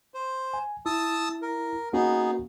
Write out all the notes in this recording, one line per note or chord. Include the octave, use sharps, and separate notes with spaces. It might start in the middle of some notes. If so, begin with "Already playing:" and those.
C5
G#5
E4 A5 D#6 E6
A#4
A#3 B3 C#4 D#4 F#4 G#4